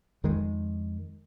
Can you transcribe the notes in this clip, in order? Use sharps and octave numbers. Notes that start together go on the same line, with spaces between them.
F2 D#3 G#3